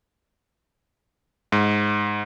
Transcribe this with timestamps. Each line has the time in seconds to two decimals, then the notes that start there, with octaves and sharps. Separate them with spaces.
1.52 G#2